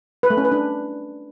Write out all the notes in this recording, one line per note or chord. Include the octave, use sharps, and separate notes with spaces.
B4
A3
C#4
B4
D4